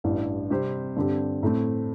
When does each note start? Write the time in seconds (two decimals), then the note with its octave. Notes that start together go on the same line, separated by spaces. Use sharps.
0.04 A1 G2 E3
0.50 C3 G3 C4 G4 C5
0.96 G2 D3 C4 G4
1.43 A2 A3 C4